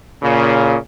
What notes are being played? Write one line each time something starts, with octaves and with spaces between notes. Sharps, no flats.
A#2 C#3